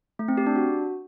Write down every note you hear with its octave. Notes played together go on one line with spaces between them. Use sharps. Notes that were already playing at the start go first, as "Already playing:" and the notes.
A3
C4
G4
D4
F#4